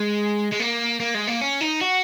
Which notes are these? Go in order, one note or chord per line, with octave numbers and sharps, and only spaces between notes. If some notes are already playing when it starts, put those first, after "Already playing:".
Already playing: G#3
G#3
A#3
A#3
G#3
A#3
C#4
D#4
F#4